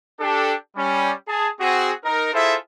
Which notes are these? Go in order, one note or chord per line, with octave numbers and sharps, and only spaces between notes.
D4 G4 A4
G3 C#4
G#4 A5
C4 F#4 G#4
D#4 A#4
E4 F4 G#4 A4 C5 E5